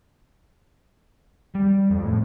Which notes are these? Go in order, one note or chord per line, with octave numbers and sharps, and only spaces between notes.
G3
F2
A2